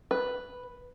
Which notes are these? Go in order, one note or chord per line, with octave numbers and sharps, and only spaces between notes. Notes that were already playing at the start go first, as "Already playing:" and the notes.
B4